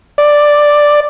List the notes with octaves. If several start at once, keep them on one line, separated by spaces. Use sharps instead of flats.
D5